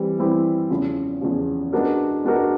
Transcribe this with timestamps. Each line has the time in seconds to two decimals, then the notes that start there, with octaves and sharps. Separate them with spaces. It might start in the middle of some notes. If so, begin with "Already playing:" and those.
Already playing: E3 G3 C4 E4 G4
0.18 E3 G3 C4 E4 G4
0.70 E2 C#3 F3
1.21 E2 C#3 F3
1.73 G#3 B3 D4 F#4 A#4
2.24 G#3 B3 D4 F#4 A#4